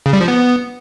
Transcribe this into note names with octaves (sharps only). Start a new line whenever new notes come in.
C#3
G3
F3
B3